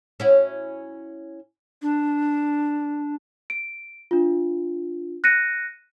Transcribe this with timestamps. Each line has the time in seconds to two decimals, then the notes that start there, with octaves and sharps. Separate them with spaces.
0.20 C#4 E4 F#4
1.82 D4
3.50 D7
4.11 D4 F4
5.24 F#6 A#6 C#7 D#7